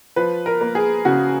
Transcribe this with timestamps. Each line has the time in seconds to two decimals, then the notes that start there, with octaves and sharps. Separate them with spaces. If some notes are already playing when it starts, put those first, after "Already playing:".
0.16 F3 B4
0.46 A#4
0.61 A#3
0.75 G#4
1.05 C#3 F#4